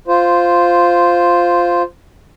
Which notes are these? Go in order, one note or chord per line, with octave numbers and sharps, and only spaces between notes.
F4 C5